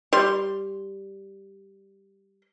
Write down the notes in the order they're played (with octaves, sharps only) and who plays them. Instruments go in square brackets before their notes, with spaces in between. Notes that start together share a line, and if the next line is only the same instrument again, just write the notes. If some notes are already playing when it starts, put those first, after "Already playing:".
[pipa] G3 C6